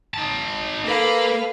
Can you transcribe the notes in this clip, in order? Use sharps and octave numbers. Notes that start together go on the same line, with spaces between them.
D#4 A5
A#3 A4 B4 F5